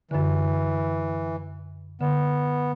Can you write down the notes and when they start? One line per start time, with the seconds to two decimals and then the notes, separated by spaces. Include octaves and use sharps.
0.11 F#2 D3 E3
2.01 D3 B3